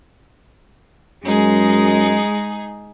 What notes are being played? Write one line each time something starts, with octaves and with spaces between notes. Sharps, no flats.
F#2 G#3 D#4 G#4